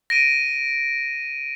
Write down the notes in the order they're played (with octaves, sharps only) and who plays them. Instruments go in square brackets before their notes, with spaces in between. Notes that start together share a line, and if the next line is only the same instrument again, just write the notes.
[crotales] A#6 D7 D#7